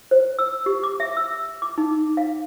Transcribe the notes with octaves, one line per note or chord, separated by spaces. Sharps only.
C5
E6
G4
D6
E5
E6
D6
D#4
F5